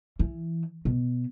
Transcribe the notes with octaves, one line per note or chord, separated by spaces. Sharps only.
E3
B2